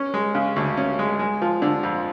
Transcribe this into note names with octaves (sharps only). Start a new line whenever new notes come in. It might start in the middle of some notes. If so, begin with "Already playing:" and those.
Already playing: C#4
G#3
C#3
D2
C#4
G#3
G#3
F3
D3
F2